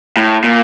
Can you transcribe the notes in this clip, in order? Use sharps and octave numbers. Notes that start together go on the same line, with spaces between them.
A2
A#2